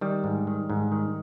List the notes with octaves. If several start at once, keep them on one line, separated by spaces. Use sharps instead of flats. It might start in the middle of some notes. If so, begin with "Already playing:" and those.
D#3 G3
G#2
D#3
G#2
D#3